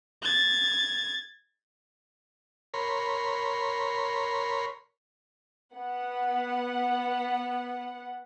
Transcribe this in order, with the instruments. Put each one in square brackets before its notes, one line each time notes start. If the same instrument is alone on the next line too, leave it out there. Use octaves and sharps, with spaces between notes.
[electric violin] G#6 A6
[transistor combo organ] A#4 C#5 B5 C6
[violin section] B3 F#5